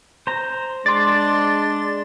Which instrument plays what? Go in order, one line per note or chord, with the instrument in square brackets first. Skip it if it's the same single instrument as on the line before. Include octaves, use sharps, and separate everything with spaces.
[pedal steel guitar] C5 A#5
[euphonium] G#3 [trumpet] D4 [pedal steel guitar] D5 [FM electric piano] C6 A6